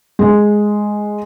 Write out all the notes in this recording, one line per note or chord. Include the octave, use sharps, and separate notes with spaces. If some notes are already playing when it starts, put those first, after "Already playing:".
G#3